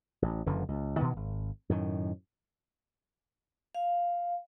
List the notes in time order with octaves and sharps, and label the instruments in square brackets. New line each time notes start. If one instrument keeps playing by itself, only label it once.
[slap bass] A1
F#1 F#2 D3 E3
C#2
B2 D#3 E3 B3
G#1
F#2 A2 D#3
[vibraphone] F5